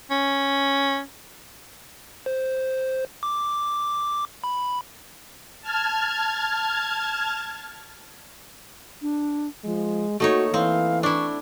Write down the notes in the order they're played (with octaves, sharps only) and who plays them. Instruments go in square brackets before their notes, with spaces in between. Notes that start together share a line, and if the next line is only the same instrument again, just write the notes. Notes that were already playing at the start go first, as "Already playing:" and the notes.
[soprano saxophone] C#4
[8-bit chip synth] C5
D6
B5
[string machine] A5 F6 G#6
[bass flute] D4
[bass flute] F3 [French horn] G#3
[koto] A3 D#4 C#5 [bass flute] A#3 [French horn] F#4
[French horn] E3 [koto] C4 [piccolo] F5
[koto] D4 E4 [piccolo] C#6